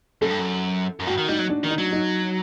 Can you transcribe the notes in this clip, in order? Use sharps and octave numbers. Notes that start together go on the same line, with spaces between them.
F#2 A4
G2
F#2
F#2
G2 F#4
D#3
G3 D#4
F#3
D4
D#3
D#4
F#3
D#4